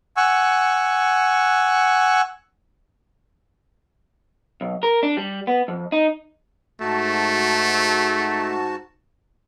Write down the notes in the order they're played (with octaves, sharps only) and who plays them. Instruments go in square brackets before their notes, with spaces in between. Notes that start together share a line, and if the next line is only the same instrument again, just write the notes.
[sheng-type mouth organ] F#5 G#5 C#6 E6
[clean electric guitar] B1
A#4
D4
G3
B3
F2
D#4
[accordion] G#2 F#4 A5 [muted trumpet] A3